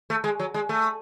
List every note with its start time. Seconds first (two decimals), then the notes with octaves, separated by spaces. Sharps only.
0.10 A3
0.24 G#3
0.40 F#3
0.54 G#3
0.69 A3